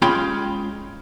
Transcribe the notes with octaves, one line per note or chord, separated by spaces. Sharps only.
G#3 C#4 F4 G5 B5